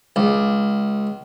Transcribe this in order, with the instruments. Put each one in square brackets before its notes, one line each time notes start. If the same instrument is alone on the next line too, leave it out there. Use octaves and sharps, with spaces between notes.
[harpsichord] C#2